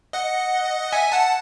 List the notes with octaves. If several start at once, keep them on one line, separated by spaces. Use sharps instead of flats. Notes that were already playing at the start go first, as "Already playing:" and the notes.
D#5 F#5
E5 G#5
F#5 A5